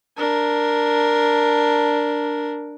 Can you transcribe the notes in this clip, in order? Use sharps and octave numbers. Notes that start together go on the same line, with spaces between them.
D4 A#4